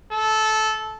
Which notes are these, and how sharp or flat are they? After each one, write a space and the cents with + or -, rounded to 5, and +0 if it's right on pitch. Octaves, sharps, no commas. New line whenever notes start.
A4 -15